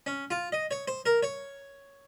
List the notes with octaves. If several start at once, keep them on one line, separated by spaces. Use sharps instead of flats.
C#4
F4
D#5
C#5
C5
A#4
C#5